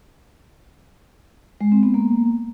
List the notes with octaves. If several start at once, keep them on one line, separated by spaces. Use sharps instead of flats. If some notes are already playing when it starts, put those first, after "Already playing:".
G#3
C4
B3
A#3